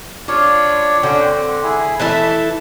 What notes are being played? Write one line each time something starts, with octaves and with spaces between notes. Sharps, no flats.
D4 F4 C#5 D5
D3 C#4 D4 F#4 G5
C4
E4 G#4
E3 A3 E4 A5